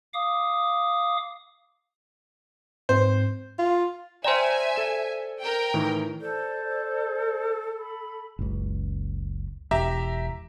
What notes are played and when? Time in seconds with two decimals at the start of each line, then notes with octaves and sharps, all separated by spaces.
0.14 F5 D6 D#6
2.89 G#2 C4 C5
3.58 F4
4.24 C5 D5 E5 G5 G#5 A#5 C6
4.76 A4 E7
5.40 A#4 G5
5.74 A2 D#3 E3
6.21 A4 C5 D5 G6
7.76 B5
8.39 F#1 C#2
9.71 E1 G4 E5 A#5